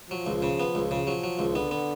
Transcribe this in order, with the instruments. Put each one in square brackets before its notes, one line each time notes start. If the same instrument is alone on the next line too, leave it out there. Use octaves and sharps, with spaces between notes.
[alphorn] F3 [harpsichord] F#3
[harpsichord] C#2
C#3
B3
C#2
C#3
[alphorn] F3 [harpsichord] F#3
[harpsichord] F#3
C#2
[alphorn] D3 [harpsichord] B3
[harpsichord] B3